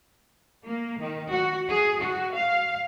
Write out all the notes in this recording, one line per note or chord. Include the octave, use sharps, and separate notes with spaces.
A#3
D#3
F#4
G#4
F#4
F5